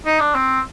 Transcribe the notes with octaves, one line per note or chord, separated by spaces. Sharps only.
D#4
D4
C4